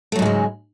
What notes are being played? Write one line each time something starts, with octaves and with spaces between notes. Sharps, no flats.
G#2 C#3 F#3 G#3 A3